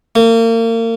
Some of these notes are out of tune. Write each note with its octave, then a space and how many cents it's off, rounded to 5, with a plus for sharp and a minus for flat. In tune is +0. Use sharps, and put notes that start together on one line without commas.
A#3 -35